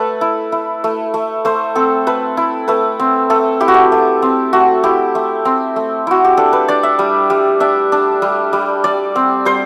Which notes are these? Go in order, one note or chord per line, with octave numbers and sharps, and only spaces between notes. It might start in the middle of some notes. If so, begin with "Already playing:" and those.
Already playing: A3 A4 B4
E4
E4
A3
A3
A3 C5
C4 A4
A3 B4
E4
A3 B4
C4
A3 A4
E4 G4
F#4
G4
A3
C4
A3 F#4
E4 G4
A3
C4
A3
E4 F#4
G4
D4 A4
B4
D4 D5
E5
G3
G3
D4 E5
D4
G3
G3
G3 D5
C4
G3 C5